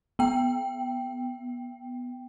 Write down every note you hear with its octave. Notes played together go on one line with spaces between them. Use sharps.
B3 G5